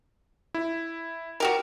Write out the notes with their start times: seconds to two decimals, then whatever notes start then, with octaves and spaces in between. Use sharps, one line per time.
0.54 E4
1.40 F#4 G4 A#4